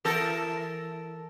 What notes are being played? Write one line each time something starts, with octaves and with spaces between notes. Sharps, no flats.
E3 A4 A#4